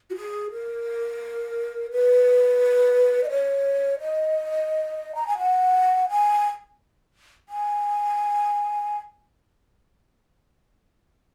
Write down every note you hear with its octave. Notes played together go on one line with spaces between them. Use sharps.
F#4
G#4
A#4
B4
D#5
C#5
D#5
A#5
G#5
F#5
G#5
G#5